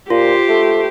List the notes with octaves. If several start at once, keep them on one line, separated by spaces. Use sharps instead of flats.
A#2 F4 G4 C5
A3